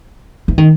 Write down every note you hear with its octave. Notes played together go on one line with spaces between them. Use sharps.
E3
D#3